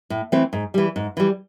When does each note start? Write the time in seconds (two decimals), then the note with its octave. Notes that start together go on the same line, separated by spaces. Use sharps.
0.10 A2
0.32 E3 A3 C4
0.53 G#2
0.74 E3 G3
0.96 G#2
1.17 E3 G3